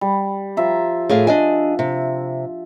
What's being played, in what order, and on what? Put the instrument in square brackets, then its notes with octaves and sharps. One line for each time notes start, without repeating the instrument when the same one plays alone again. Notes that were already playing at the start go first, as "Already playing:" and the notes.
[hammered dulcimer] G3
F3 E5 A#5
[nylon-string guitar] A2 G#4 F5
D4 D#5 G#5
C3